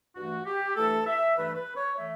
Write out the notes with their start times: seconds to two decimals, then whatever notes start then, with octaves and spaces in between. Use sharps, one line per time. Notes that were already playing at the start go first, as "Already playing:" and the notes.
0.15 G2 E3 A3 F#4
0.46 G4
0.76 G2 E3 A3 A4
1.06 E5
1.36 G2 E3 A3 B4
1.55 B4
1.75 C#5
1.95 E3 A3 E5